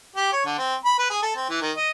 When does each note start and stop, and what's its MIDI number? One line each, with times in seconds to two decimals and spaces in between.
0.16 0.30 67
0.33 0.43 73
0.46 0.55 50
0.58 0.75 60
0.85 0.99 83
0.99 1.09 71
1.10 1.21 68
1.23 1.33 69
1.36 1.46 60
1.49 1.57 52
1.61 1.72 51
1.77 1.91 75